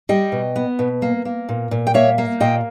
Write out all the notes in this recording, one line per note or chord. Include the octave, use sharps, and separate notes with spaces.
G3 D#5 G5
B2
B3
B2
A#3
A#3
A#2
A#2
G5
A#3 C#5 E5
A#3
A#2 D#5 G5